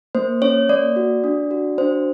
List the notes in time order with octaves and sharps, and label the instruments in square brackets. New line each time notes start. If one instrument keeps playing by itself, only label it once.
[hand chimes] A#3 C5
C#4 C#5
A#3 D5
F#4
D4
F#4
D4 C5